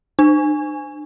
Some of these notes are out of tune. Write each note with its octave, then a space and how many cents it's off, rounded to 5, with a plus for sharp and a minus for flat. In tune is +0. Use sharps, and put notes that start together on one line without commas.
D4 +45